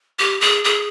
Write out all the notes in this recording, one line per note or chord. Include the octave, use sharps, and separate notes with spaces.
G4
G#4
G#4